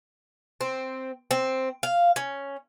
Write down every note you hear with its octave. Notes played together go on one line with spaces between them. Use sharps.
C4
C4
F5
C#4